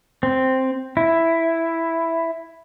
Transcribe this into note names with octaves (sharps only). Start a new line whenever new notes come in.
C4
E4